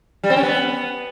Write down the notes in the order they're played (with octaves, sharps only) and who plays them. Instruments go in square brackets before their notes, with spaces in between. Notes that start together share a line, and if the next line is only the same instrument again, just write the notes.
[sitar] G3
C4
C#4
B3